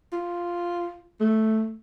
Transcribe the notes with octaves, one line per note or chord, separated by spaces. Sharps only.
F4
A3